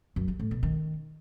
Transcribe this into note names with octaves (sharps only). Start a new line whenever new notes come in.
F#2
G3
A2
B2
D#3